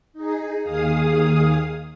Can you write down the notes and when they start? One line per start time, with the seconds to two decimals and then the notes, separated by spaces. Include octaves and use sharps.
0.13 D#4 G#4
0.62 D#2 D#3 G#4 F5 D#6